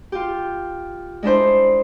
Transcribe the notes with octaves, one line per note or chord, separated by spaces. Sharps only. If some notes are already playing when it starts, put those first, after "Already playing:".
F4 G4
G#3 D4 E4 C5